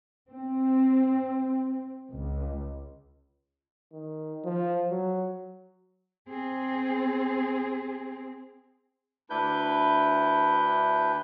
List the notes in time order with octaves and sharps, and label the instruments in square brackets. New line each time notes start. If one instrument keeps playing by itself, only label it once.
[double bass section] C4
C#2
[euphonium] D#3
F3
F#3
[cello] C4 G#4
[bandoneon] D2 D4 E4 B4 G6